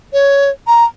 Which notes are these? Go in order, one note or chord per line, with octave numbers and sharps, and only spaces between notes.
C#5
A#5